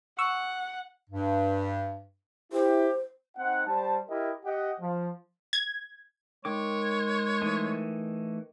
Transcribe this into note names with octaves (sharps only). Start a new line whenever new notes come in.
F#5 C#6 E6
G2
E4 G4 C5
C4 D#4 F#5
G3 C5 A5
E4 G4 A#4 D#5
G4 D#5 F#5
F3
G#6
D#3 G#3 C#5 D6
E3 A3 D#4